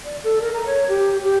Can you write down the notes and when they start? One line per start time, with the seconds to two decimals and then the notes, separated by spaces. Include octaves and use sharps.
0.05 D5
0.24 A4
0.41 A#4
0.54 A#5
0.66 C#5
0.89 G4
1.24 G4